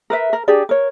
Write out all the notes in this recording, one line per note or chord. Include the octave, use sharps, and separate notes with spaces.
A#4 B4 E5
A#4
D4 G4 G#4 D5
A#4 C#5